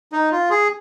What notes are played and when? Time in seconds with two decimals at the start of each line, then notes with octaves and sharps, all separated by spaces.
0.12 D#4
0.32 F4
0.50 G#4